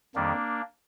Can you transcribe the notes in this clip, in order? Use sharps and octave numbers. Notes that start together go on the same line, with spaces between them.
F2 D#3 G3 A#3 D4